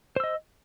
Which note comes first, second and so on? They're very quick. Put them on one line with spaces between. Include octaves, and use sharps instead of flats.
C5 E6 D#5